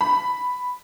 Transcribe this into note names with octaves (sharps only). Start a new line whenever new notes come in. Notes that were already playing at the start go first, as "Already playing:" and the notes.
B5